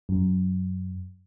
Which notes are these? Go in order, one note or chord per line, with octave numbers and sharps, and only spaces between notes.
F#2